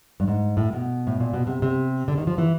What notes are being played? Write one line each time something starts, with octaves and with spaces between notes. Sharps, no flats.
G2
G#2
A2
B2
A2
A#2
B2
C3
C3
D3
D#3
F3
E3